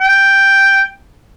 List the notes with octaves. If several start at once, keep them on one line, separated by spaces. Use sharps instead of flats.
G5